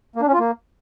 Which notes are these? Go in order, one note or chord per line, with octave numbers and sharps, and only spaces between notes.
A#3
D4
C#4
F4
A#3